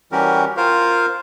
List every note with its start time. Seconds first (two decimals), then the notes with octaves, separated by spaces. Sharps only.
0.12 E3 G3 C#4 F#4 G4 A#4
0.57 F4 A#4 C5 F5